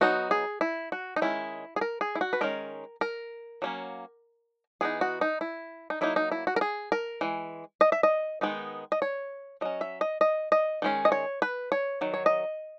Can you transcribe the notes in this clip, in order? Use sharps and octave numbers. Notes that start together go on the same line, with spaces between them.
F#3 B3 D#4 F#4
G#4
E4
F#4
D#4
D#3 G#3 C#4 E4
G#4
A#4
G#4
E4
F#4
B4
D#3 G#3 C#4 A#4
A#4
F#3 A#3 C#4
E3 B3 D#4 G#4
F#4
D#4
E4
D#4
F#3 A#3 D#4 E4
D#4
E4
F#4
A#4
G#4
A#4
E3 G#3
D#5
E5
D#5
D#3 G#3 B3 D#4
D#5
C#5
F#3 C#4 D#5
E5
D#5
D#5
D#5
D#3 G#3 C#4
D#5
C#5
B4
C#5
D#3 F#3
C#5
D#5